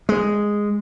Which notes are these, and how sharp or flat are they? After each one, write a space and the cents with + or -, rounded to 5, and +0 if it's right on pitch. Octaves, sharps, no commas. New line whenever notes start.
G#3 -5